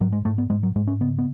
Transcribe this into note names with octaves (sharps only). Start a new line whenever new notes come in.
G#2 F#3
G#3
G#2 A3
B3
G#2 G#3
F#3
G#2 G#3
C#4
C#3 B3
B3